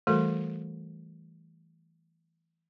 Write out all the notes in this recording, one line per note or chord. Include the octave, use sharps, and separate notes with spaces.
E3 G3 A3 F#4 A4 A#4